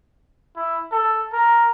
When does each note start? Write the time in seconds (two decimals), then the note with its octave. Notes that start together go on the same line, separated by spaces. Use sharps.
0.56 E4
0.92 A4
1.33 A#4